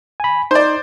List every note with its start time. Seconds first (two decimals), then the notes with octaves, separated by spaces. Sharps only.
0.20 G#5 B5
0.51 D#4 C5 D5